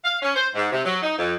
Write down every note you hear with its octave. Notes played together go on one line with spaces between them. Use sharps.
F5
C#4
C5
G#2
C3
F#3
D#4
F2